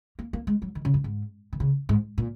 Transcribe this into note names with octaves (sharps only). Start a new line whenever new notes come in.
A#3
A#3
G#3
F#3
D#3
C#3
F#2
G#2
D#3
C#3
G#2
A#2